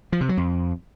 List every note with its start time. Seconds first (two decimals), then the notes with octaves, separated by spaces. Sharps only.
0.12 F3
0.21 C3
0.29 F#3
0.37 F2